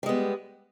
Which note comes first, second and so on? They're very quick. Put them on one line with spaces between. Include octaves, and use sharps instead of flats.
G3 G#3 B3